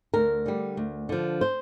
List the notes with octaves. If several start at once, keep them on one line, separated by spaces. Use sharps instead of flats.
D2 A#4
D3 G3
D2
D3 F3
C5